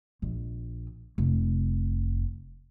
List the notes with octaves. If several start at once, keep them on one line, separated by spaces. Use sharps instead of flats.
A#1
F1